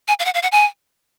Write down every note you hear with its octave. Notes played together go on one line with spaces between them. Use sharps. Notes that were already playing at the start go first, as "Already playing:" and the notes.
G#5
F5
F#5
F5
F#5
G#5